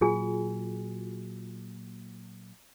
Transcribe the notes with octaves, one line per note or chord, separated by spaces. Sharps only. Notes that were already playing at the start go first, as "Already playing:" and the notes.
A#2 F#3 F4 G#4 G#5